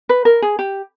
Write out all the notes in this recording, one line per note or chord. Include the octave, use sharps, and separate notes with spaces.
B4
A#4
G#4
G4